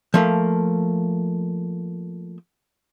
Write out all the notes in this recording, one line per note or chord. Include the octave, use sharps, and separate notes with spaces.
F3 A3 A#3